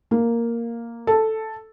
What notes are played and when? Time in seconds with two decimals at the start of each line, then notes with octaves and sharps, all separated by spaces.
0.11 A#3
1.07 A4